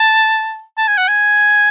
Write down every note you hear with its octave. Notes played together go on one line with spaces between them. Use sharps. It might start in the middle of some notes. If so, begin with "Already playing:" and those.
Already playing: A5
A5
G#5
F#5
G#5